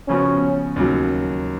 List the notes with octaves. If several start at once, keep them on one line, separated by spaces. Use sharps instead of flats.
C#3 F3 B3 C#4 F#4
D#2 C#3 F#3